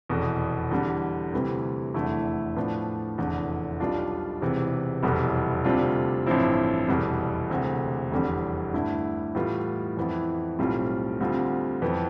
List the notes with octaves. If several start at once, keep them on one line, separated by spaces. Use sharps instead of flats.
F1 E2 B2
E2 D3 G3
D2 C3 E3 G3
F1 E2 D3 A3 E4
A2 F3 B3 D4 F4
F1 E2 D3
B1 B2 G3 D4 F4
E1 E2 C3 E3
F1 E2 B2 G3
D2 C3 G3 D4 F4
A1 G2 F3 C4 E4
F1 E2 B2 G3
E1 D2 C3
F1 E2 D3 G3
G2 D3 A3 E4
A2 E3 G3 B3 F4
F2 E3 B3 E4
B1 A2 G3 C4 F4
D2 D3 G3 C4 F4
F2 E3 B3